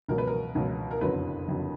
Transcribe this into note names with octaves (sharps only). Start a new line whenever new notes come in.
C#2 B2 F#3 A#4
B4
A#4
C#2 B2 F#3
A#4
F#1 F2 D3 F#3 B4
F#1 F2 D3 F#3